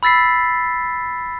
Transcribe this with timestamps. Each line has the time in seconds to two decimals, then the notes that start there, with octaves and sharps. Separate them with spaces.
0.03 B5 E6 A6 B6 C7